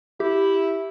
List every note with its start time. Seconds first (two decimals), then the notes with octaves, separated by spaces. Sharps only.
0.20 E4 G4